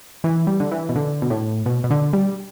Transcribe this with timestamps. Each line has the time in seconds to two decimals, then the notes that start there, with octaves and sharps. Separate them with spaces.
0.24 E3
0.47 G3
0.60 D3
0.71 E3
0.89 B2
0.96 D3
1.22 B2
1.30 A2
1.66 B2
1.84 B2
1.91 D3
2.13 G3